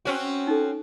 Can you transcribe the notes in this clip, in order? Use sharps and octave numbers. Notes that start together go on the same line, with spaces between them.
C4 C#4 F#4
D#4 A4